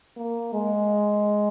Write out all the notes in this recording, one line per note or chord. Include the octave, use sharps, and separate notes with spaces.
A#3
G#3